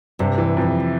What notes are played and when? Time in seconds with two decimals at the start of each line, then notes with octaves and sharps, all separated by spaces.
0.19 G2 C3
0.38 E3
0.57 F2